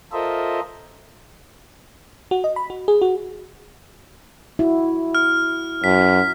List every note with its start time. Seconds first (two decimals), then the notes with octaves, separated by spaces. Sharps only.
0.12 F4 A4 A#4 C5 D#5 E5
2.31 F#4
2.44 D#5
2.56 B5
2.70 F#4
2.88 G#4
3.02 F#4
4.59 E4 F#4
5.15 F6
5.84 F#2 B6